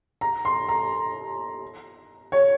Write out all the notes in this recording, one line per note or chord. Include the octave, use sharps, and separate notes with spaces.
A#5
C6
A#5
C#5